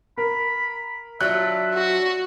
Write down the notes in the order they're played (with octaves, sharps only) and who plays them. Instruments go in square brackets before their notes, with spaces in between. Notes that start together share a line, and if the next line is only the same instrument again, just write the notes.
[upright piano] A#4 [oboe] B5
[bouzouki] F#3 D4 F4 [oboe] E5 [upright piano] F#6
[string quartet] F#4